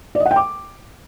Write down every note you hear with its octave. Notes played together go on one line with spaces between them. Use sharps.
D5
D#5
F#5
G5
D6